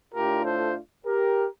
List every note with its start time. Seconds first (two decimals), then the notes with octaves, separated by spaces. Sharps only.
0.14 A2 A3 D4 F4 G4 A#4
0.44 A4 C5
1.06 G4 A#4